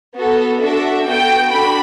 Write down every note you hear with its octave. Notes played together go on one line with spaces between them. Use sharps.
B3 F#4 A4
D4 F#4 A4 E5
B3 F#4 A4 G5
D4 F#4 A4 B5